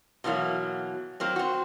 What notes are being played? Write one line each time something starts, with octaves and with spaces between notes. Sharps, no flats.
B2 E3 F#3 A#3
F#3 A#3 C4
C4 F#4